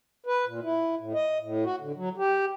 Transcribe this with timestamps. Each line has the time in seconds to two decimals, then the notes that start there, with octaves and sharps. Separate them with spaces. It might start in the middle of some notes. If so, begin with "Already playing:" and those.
0.26 B4
0.46 A#2
0.63 E4
0.99 A2
1.14 D#5
1.42 A2
1.64 F#4
1.80 D3
1.96 F#3
2.18 G4